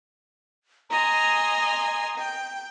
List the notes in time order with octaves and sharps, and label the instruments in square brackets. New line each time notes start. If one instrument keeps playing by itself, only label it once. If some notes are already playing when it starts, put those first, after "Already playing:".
[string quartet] D#5 G#5 C6 [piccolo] A#5
[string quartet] G5